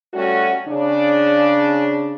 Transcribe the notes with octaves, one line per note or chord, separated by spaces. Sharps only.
G3 A3 C#4 F#4
C#3 D4